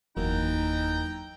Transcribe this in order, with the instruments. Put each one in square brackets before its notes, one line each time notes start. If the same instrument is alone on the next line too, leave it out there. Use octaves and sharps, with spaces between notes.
[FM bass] F#1 [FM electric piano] E2 F#3 A#3 [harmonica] E3 G5 A#5 [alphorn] D#4